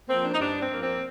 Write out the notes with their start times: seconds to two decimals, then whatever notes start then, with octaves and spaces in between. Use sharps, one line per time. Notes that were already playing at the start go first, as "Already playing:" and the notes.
0.09 F3 A#3 C4
0.25 D4
0.34 D#4
0.40 G2 D4
0.62 C4
0.72 F3 A#3
0.83 C4